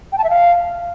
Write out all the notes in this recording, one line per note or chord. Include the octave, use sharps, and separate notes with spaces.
G5
A5
E5
F5